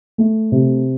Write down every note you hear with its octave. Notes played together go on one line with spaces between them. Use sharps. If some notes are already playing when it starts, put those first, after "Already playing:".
A3
C3